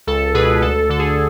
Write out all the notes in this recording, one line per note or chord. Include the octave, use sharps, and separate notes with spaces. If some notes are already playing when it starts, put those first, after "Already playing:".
C#2 A4
B2 G#4 B4
D2 A4
D3 A4
G#4